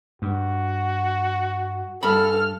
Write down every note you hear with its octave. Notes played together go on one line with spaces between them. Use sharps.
G2 F#4
G2 A4 B5 F6